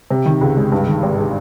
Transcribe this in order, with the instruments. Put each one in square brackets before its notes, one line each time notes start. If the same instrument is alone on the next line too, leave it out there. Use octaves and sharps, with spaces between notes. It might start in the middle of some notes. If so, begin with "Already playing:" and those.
[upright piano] C3
D#3
C#2
G#3
G2
D#3
G#1
G#3